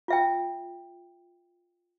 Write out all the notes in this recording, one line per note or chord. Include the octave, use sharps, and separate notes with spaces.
F4 E5 G5